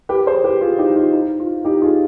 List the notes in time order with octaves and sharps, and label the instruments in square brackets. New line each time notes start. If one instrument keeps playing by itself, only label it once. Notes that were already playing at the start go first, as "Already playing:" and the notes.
[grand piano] G4 B4
G#4 C5
G4 B4
F4 G#4
D#4 G4
F4
D#4
F4
D#4 G4
F4 G#4